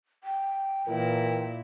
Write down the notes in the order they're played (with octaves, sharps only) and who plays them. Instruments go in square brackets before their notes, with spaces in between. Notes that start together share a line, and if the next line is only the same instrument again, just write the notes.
[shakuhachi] G5
[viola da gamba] A#2 E4 [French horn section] E3 A#4